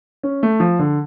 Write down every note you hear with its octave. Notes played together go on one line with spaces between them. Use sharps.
C#4
A3
F3
D3